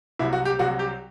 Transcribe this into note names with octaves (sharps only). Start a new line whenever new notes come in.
C2 C3 F#3 E4
F#4
G4
C2 C3 F#3 F#4
G4